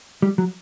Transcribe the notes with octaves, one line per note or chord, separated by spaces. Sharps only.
G3
F#3